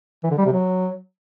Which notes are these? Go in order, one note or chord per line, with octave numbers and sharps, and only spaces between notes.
E3
D3
G3
C3
F#3